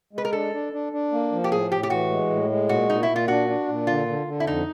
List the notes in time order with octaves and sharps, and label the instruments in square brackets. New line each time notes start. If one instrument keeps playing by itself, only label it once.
[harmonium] G#3 [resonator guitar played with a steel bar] B4
[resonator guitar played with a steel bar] A#4
[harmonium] D4 [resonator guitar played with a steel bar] A4
[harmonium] D4
D4
D4
A#3
F3
[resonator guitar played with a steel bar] G4
[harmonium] A2 [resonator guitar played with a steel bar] G#4
[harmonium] A2 [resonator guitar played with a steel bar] G4
[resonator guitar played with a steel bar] G4
[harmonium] E3 [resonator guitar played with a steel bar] F#4
[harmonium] G#3
A2
G#3
[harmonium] A#2 [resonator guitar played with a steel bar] F#4
[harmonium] A#2 [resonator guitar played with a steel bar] D#4
[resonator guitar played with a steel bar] E4
[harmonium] A#2
[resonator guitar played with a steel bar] F4
[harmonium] D4 [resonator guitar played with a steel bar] F#4
[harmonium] D4
A#2
[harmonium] D3 [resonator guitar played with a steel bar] F4
[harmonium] D3
D3
[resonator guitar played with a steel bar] E4
[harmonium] F2 [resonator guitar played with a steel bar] D#4